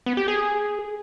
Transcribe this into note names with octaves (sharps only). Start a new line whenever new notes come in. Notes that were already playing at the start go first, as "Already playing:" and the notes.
B3
G4
G#4